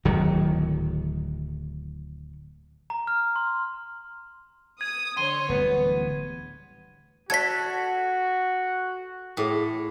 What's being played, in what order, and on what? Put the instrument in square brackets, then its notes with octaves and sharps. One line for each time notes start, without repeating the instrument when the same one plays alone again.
[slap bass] D1 D#3 F#3
[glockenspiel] A#5
F6
C6
[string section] D#6 [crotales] G#6
[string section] D3 C#5 [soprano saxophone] C6 [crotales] D#7
[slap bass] D1 D2 G3 [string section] E3 [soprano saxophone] B3
[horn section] F#4 [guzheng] A4 [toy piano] D5 A5 [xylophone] G#6 B6
[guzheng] A2 [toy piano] G#4 A4 G5